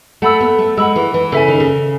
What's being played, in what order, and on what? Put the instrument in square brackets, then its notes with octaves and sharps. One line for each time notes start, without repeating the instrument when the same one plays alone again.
[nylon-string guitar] A3 [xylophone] F#5 B5 E6
[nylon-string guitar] B3
A3
[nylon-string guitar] G#3 [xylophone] F#5 B5 E6
[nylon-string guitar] E3
E3
[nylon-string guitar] C#3 [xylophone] A4 E5 G#5
[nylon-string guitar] D#3
C#3